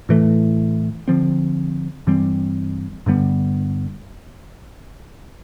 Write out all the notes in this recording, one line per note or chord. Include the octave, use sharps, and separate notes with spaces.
A2 E3 A3
D3 F3 C4
G2 E3 G3 C4
G2 D3 G3 B3